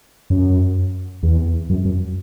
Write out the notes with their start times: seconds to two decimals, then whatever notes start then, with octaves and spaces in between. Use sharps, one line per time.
0.30 F#2
1.23 E2
1.70 F#2
1.85 F#2